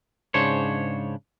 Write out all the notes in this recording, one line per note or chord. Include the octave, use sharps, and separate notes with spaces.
G#2 C#3 D4 C5 C#5